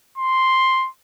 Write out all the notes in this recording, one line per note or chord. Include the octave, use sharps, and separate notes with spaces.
C6